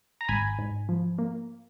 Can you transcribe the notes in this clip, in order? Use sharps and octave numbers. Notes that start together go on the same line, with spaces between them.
A#5
G#1 G#5 B5
G#2
F3
A#3